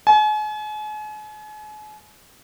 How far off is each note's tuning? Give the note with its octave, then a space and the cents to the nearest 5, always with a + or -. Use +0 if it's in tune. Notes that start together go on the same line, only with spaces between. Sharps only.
G#5 +40